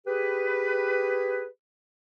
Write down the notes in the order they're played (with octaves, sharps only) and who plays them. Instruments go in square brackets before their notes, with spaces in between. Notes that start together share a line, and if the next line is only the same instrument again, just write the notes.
[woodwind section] G4 G#4 B4